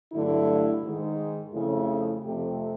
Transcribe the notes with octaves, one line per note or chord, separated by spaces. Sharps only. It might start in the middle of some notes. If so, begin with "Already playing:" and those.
G2 D3 F#3 A3 E4
G#2 D#3 G#3
F2 C#3 F3 A3 E4
F2 C3 F3 A3 G4